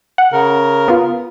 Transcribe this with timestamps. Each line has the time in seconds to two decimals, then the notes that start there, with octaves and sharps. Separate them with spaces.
0.18 F#5
0.32 C#3 A#4
0.88 B3 F4